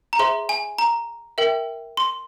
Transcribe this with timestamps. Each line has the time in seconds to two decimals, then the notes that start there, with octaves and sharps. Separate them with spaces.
0.13 A#5
0.19 G#4 C5 E5 C6
0.49 G#5
0.78 A#5
1.38 A#4 E5 G5
1.97 C6